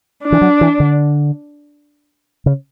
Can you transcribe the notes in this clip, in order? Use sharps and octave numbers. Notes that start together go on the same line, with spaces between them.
D4
E3
F#3
E3
D3
C#3